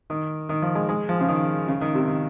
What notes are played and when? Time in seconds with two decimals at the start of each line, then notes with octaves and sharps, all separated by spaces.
0.10 D#3
0.49 D#3
0.62 F3
0.75 G#3
0.89 G#3
1.09 F3
1.21 C#3
1.28 D#3
1.68 C#3
1.81 D#3
1.95 C3
2.08 D#3